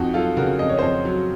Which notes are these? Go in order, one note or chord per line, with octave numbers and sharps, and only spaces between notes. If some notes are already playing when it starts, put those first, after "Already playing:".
Already playing: F2 D#4 F#4
F#3 F4 A4
C#3 F#4 A#4
F2 D#5
C#5
F2 C5 D#5
F#3